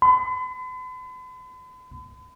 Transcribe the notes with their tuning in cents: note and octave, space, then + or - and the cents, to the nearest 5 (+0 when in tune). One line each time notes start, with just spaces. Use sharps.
B5 +45